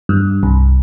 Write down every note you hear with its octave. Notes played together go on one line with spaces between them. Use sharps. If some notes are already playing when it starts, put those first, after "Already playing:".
G2
C2